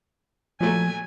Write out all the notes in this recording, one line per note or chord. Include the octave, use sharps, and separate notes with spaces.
A#2 F3 F#3 A3 G#5